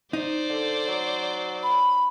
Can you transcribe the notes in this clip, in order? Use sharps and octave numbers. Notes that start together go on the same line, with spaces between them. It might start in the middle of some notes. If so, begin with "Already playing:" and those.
D#4 C5 D5
D3
F#3
B5